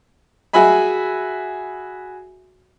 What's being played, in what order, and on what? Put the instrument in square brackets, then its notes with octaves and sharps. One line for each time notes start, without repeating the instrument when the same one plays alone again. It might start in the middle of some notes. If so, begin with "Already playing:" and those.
[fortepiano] F#4 G#4 E5 G#5 B5